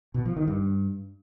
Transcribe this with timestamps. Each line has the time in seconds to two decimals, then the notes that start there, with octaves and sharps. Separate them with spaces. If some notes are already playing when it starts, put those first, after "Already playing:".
0.14 B2
0.25 F3
0.37 D#3
0.48 G2